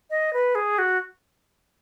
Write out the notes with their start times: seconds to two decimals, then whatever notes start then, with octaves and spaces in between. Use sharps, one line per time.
0.10 D#5
0.33 B4
0.55 G#4
0.79 F#4